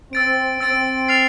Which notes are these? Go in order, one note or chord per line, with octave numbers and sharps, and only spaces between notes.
C4 E6 A6 D7
C4 E6 A6 D7
F6 A6 C7 F7